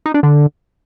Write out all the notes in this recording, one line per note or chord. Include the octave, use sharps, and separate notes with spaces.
D#4
D4
D3